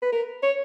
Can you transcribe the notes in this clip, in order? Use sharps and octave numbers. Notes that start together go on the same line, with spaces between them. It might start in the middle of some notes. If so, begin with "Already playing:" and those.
B4
A#4
C#5